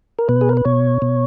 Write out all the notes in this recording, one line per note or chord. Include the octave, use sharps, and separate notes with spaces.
A#4
B2 B4
G#4
A#4
B4
B2 C#5
B2